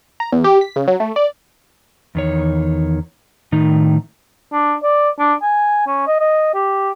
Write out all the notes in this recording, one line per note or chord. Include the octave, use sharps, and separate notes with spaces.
A#5
E2
G4
B6
C#3
F#3
A3
D5
E2 D#3 C#5
A2 D#3 D#4
D4
D5
D4
G#5
C#4
D#5
D#5
G4